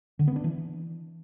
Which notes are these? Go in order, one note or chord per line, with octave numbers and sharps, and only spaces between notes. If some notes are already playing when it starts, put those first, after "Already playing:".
D3
B3
D4
E3